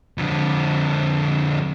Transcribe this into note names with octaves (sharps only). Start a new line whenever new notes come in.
F2 D3